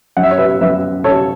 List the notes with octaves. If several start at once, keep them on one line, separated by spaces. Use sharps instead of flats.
F#2 F#5
E5
C#5
B4 E5
F#2 B4 E5
C#4 A4 C#5